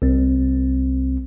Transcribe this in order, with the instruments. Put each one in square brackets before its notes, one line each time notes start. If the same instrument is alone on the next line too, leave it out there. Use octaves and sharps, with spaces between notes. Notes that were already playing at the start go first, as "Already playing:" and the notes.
[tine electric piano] C2 C4